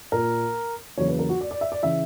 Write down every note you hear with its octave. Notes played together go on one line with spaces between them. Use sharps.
A#2 A#3 A#4
E2 C#3 F#3 A#3 C#5
B4
A#4
F#4
D5
D5
E5
D5
C#3 E3 E5